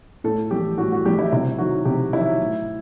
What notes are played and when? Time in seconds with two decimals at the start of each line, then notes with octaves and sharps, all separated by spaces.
0.24 A2 A4
0.51 E3 G3 G4
0.78 A2 F#4
0.92 F#4
1.05 E3 G3 G4
1.19 E4
1.32 C3 E4
1.58 D#3 F#3 F#4
1.85 C3 G4
2.13 D#3 F#3 E4
2.40 A2